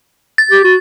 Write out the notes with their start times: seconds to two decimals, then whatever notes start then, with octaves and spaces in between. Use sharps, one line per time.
0.38 A6
0.51 G4
0.64 F#4